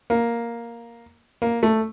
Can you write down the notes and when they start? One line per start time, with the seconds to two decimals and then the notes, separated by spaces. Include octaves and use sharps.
0.10 A#3
1.42 A#3
1.63 A3